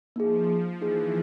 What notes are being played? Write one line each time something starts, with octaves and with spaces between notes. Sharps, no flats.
F3 A#3 D#4 G#4
E3 A#3 D#4 G#4